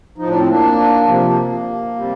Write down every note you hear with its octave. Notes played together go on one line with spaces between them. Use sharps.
A2 F3 D#4
D4
C4
A#3 D4
C3 F3 A#3
C3 G3